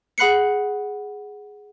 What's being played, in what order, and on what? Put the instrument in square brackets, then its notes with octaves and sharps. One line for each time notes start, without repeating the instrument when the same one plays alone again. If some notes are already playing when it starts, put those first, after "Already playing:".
[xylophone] G#4 F#5 B5 F#6 C7 C#7